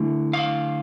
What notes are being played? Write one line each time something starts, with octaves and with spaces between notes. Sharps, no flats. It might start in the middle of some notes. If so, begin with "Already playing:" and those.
Already playing: D3 A3 E4
F5